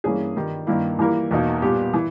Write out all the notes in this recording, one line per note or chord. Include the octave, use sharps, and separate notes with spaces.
G2 E3 A#3 C#4 G#4
G2 D#3 G3
G2 D#3 A#3 E4
E3 G3 A#3 E4 A#4
E2 B2 A#3 D#4
A#2 G3 B3 G4
E3